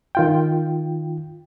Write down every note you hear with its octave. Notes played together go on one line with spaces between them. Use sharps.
D#3 F4 G5